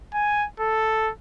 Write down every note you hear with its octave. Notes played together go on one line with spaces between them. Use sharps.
G#5
A4